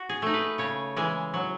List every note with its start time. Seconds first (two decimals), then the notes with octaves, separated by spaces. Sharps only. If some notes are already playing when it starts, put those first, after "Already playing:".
Already playing: F#4
0.09 G#4
0.22 A3 D#4
0.34 B4
0.58 C#3 C#5
0.96 E3 G#3
1.34 F#3